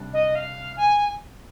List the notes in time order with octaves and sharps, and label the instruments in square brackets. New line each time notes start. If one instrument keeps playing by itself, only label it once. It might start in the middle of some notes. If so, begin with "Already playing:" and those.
Already playing: [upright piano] C3 G3 D4
[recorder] D#5
F5
G#5